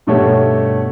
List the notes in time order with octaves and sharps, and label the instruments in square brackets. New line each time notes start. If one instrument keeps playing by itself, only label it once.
[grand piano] G2 B2 A3 G4 A4 C#5